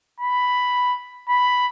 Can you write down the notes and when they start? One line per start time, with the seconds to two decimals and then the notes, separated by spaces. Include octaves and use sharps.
0.20 B5
1.29 B5